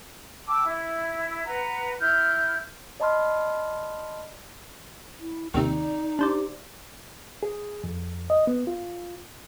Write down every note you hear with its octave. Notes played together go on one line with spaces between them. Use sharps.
G5 A5 D6 E6
E4
B4 F#5 A#5
E4 F6 G6
D5 D#5 A5 B5 C6 F6
E4
D#2 C3 D#4 D5
D4 G4 C5 D5
G#4
F2
D#5
B3
F4